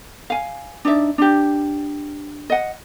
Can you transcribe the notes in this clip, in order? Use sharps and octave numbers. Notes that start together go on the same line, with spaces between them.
F5 G#5
D4 D#4 D5 E5
D4 G4
D#5 F#5